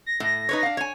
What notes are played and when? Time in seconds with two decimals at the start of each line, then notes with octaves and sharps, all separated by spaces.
0.06 A#6
0.20 A2
0.49 D#4 B4 C#5
0.63 D4 F5
0.77 C#5 G#5